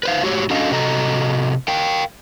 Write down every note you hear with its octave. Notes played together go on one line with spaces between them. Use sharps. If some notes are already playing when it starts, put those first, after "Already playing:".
B4 C5 F5
A2 F#4 G4 C#5
C#4 D4 F#4 A4 D#5 F5
C3 F#4 A4 D#5 A#5
A#4 F5 G5